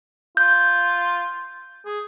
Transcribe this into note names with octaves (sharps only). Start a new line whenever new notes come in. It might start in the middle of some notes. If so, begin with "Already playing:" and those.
F4 G6
G#4